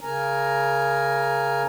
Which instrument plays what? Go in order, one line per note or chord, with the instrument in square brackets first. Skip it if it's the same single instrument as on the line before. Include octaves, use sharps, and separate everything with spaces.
[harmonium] C#3 A#4 G#5 A#5